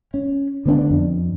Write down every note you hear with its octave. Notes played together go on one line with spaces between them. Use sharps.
C#4
D3 B3 C4 D4
F2